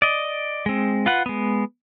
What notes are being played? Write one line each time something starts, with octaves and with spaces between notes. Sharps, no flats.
D5 D#5
G#3 C4
F4 B4 F#5
G#3 B3